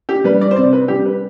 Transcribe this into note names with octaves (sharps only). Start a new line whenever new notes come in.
G4
G3 B4
D5
C5
C3 D5
B4
G3 G4
B4